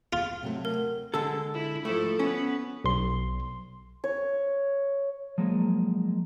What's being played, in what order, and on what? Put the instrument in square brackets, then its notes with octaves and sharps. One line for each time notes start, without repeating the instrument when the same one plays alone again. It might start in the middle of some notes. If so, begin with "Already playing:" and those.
[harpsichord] F4
[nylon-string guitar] C3 F#3 A3
[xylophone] A#4
[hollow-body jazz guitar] D3 G#3 A4
[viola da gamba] E4
[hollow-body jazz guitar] G#2 A3 [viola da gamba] F3 E4 A4
[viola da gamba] B3 B4 [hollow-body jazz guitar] C#4
[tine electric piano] B1 C6
[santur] C#5
[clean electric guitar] F3 F#3 G#3 A#3